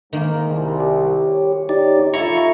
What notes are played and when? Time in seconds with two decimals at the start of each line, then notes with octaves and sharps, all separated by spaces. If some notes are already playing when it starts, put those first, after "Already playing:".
0.13 G#2 D#3 A#3
0.46 C2
0.80 G4
1.28 C#5
1.69 D#4 G4 D5
2.14 E4 F4 A4 A#5 C#6